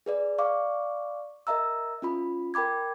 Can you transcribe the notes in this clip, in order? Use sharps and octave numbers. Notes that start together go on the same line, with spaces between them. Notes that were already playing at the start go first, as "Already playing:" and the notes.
G#4 B4 D5
D5 F5 C#6 D6
A#4 D#5 E5 A#5 E6
C#4 F4 B5
A#4 G5 B5 D6 G#6